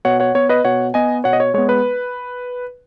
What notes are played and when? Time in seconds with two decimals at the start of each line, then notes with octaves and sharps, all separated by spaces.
0.05 B2 C#5 F#5
0.20 C#5 F#5
0.35 B3 C#5
0.49 B4 D#5
0.65 B2 C#5 F#5
0.94 B3 D#5 G#5
1.24 B2 C#5 F#5
1.33 D#5
1.40 C#5
1.54 G#3 B3 C#5
1.69 B4